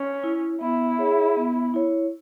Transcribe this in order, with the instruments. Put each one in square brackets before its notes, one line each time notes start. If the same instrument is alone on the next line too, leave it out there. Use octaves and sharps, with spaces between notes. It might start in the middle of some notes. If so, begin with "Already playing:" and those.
Already playing: [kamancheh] C#4
[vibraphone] E4 C#5
[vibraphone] B3 [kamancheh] E4
[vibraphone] G#4 C#5 F#5
B3
E4 C#5